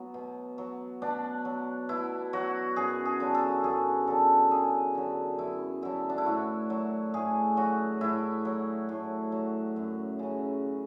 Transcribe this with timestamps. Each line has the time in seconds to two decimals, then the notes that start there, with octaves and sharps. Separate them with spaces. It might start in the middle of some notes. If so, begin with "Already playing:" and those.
Already playing: F#3 B3
0.14 B2
0.58 F#3
1.02 B2 D4
1.45 F#3
1.89 B2 E4
2.33 F#3 F#4
2.76 F#2 G#4
3.05 G#4
3.20 D3 F#3
3.34 A4
3.64 F#2 G#4
4.07 D3 F#3 A4
4.51 F#2 G#4
4.95 D3 F#3
5.39 F#2 E4
5.82 D3 F#3 E4
6.10 D4
6.18 E4
6.26 A2 F#4
6.70 F#3
7.14 A2 G#4
7.57 F#3 F#4
8.01 A2 E4
8.45 F#3
8.89 A2
9.32 F#3
9.76 F#2
10.19 C#3 F#3